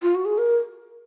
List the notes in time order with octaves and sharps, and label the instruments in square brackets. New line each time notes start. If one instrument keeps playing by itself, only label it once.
[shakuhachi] F4
F#4
G#4
A#4